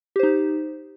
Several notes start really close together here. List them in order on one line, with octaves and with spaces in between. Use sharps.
G4 C5 D#4